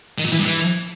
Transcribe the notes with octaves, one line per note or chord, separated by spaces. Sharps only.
D#3
A#2
E3
G2
E3